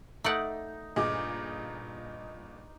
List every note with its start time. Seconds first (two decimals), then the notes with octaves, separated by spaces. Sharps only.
0.24 A3 D#4 D5 F#5
0.96 G1 A#2 G#4 D#5 D6